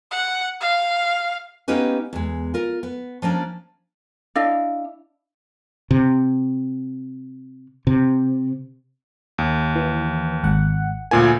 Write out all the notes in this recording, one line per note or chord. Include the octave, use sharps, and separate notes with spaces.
F#5
F5
A#3 B3 C#4 D#4 G4 B4
E2 G#3
F4 A#4
B3
F3 A#3 C#4 D4
D4 E4 D#5 F5
C3
C3
D#2
E3
G#1 F#5
D2 A#2 F3 A#3 G#5